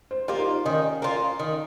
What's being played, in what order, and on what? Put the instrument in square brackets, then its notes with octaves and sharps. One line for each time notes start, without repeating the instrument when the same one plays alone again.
[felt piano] C5
[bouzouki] A#3 F4 [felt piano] G4
[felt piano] D#4
F4
[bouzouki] D#3 [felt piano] C#4
[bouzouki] A#3 F4
D#3